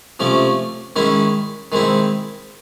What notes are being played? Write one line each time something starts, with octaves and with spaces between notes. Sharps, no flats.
C3 F3 A3 C#4
D#3 G#3 C#4 E4
D#3 G#3 C4 E4